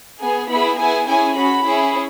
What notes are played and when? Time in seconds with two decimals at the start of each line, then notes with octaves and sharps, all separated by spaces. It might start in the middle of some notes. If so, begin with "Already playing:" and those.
0.20 B3 G#4 G#5
0.49 B3 E4 G#4 B5
0.79 B3 E4 G#4 G#5
1.08 C#4 E4 G#4 G#5
1.36 C#4 F#4 B5
1.66 C#4 E4 G#4